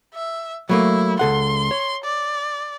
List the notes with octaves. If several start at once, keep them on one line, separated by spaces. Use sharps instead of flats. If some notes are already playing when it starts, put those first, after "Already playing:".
E5
F#3 A3 A#3 E4
C#2 A4 F#5 C6
C#5
D5